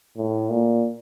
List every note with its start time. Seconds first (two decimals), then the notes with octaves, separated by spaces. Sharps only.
0.17 A2
0.50 A#2